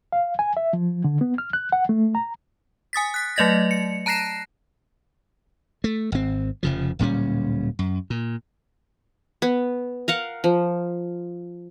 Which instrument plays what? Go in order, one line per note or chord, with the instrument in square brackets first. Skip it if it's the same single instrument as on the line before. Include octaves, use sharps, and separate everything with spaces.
[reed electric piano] F5
G#5
E5
F3
D3
B3
F6
F#6
F#5
A3
A#5
[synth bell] G#5 D#6 A6 B6
F#6 B6
F#3 A3 D5 D#5 A6 A#6
C#7
A5 A#5 F#6 A#6 C7 E7
[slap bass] A3
G#1 C4
F1 C#3 F3
D1 A#2 G3 C#4
F#2
A#2
[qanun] B3
A#4 F5 F#5
F3